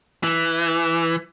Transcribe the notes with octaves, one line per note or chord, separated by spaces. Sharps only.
E3